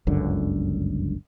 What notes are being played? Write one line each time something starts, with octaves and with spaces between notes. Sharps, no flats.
G1 C#2 F#2 D3